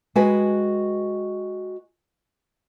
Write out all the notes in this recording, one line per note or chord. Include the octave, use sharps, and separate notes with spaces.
G#3 F#4 G#4 B4 G5 G#5